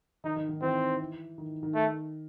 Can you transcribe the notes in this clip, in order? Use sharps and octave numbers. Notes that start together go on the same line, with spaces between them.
D#3 D#4
D#3
D#3
E3 C4
D#3
D#3
A3